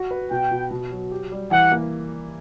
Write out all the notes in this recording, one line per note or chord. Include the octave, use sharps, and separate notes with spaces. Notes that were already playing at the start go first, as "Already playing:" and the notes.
Already playing: F#4
B4
B2 G5
B2
B2
F#3
G4
G3
E3 F#5
A#3